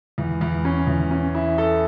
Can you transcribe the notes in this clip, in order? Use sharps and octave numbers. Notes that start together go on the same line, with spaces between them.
E2
E2
C#4
E2
C#4
E4
A4